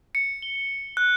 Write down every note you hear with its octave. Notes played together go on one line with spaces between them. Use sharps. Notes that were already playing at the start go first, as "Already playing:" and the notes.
C#7
G7
F#6